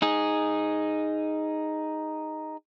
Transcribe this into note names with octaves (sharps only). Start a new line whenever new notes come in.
D#4 G#4